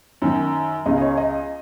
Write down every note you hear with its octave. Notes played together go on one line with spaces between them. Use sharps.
F#2 D#3
C#2 C#3 D#5
D#5
C#5
D#5